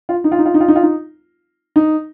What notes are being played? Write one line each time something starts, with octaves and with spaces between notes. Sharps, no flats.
F4
D#4
F4
D#4
F4
D#4
F4
D#4
F4
D#4
D#4